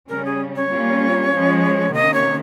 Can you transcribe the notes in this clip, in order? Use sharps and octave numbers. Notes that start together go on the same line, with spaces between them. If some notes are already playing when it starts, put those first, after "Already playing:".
C#3 G3 C#4 A#4
G#4
C#5
G3 A#3 C#4 F4
F3 G#3 C#4
C3 D#3 A#3 C#4 D#5
C#5